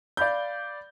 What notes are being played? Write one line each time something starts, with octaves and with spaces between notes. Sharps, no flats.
D5 F5 B5 G6